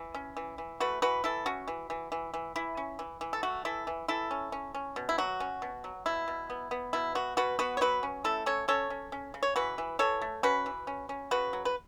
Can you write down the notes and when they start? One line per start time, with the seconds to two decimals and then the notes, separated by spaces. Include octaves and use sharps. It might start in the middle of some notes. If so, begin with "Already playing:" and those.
Already playing: E3
0.14 C#4
0.37 E3
0.58 E3
0.80 A3 F#4 B4
1.02 E3 F#4 B4
1.24 E3 E4 A4
1.46 C#4 F#4
1.68 E3
1.90 E3
2.12 E3
2.34 E3
2.56 E3 E4
2.77 C#4
2.99 E3
3.21 E3
3.33 A4
3.43 A3 F#4
3.65 E3 E4 A4
3.87 E3
4.08 E3 E4 A4
4.31 C#4
4.52 C#4
4.75 C#4
4.96 B2
5.09 E4
5.18 F#3 F#4
5.40 C#4
5.62 B2
5.84 F#3
6.06 B2 E4
6.28 B2
6.50 B3
6.71 B3
6.93 B2 E4
7.15 B3 F#4
7.37 B2 F#4 B4
7.59 B3 F#4 B4
7.77 C#5
7.81 F#3 F#4 B4
8.03 C#4
8.24 A3 E4 A4
8.46 C#4 A4 C#5
8.68 C#4 A4 C#5
8.90 C#4
9.12 C#4
9.34 C#3
9.43 C#5
9.56 E3 F#4 B4
9.78 E3
9.99 E3 A4 C#5
10.22 A3
10.43 C#4 F#4 B4
10.66 E3
10.87 C#4
11.09 C#4
11.31 C#3 F#4 B4
11.53 F#3
11.65 B4